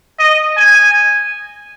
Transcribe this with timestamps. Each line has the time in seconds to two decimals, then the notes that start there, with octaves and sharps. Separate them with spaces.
0.19 D#5
0.57 G#5